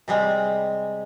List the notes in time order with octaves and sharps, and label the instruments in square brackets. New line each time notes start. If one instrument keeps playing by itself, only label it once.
[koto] C3 G3 G#3